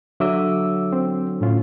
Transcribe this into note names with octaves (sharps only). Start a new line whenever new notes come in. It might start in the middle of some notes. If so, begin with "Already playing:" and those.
D3 F#3 E5 D6 E6
C4
A2 C#4 F4